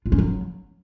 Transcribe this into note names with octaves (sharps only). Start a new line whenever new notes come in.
F4
C#4
F#3